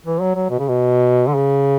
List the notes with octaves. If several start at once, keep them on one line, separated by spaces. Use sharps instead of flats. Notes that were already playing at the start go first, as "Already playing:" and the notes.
E3
F#3
F#3
B2
C#3
B2
D3
C#3